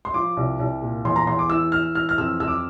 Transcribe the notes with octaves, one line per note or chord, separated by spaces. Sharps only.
C6
F3 D6
C2
C2
A#2
E2 C6
A#5
E2 C6
D6
E3 E6
E3 F6
E3 F6
F6
F2 E6
F2 E6
D6